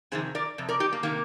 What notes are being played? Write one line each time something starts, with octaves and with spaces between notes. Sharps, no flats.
F2 C3 D#3 G#4 C5
A#4 D5
F2 C3
A#4 D5
D#4 G4
A#3
C3 D#3 A#3